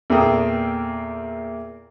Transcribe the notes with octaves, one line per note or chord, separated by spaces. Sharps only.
E2 A#2 A#3 A4 G5 D#6